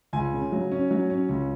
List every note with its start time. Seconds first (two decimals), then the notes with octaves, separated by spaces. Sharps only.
0.13 C#2 G#5
0.33 C#3
0.52 F#3
0.72 C#4
0.91 F#3
1.10 C#4
1.29 C#2